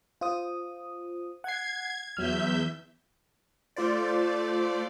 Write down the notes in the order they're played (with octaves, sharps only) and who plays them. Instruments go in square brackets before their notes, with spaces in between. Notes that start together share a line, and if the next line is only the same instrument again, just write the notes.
[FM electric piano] F4 C5 D#6
[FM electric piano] F#5 C7 [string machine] G#6
[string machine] E2 E5 G6 [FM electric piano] F#3 F6
[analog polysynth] A3 F4 C5 D5